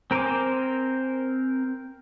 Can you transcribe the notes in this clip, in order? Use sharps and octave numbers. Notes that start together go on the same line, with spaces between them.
C4 A#4 C5 G#5 D6